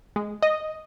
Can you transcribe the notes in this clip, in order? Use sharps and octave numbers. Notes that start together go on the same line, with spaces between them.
G#3
D#5